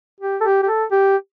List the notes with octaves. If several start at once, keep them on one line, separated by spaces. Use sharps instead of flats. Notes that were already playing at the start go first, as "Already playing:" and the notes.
G4
A4
G4
G4
A4
G4